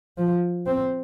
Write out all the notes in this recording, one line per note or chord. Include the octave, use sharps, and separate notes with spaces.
F3
C4